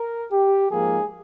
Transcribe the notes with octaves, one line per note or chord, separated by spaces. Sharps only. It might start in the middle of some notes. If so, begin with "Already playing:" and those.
Already playing: A#4
G4
G#2 F3 A#3 G#4